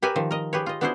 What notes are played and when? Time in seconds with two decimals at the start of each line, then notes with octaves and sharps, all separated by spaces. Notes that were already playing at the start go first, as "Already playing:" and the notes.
0.02 G4 A#4 B4 C#5 E5 G#5
0.16 D#3 F3
0.31 A#4 D#5
0.53 G4 G#4 B4 C#5
0.66 F4 D#5
0.81 B3 D4 E4 F#4 G#4 C5